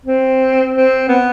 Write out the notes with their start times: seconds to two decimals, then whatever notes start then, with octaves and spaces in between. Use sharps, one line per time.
0.06 C4
0.75 C4
1.08 B3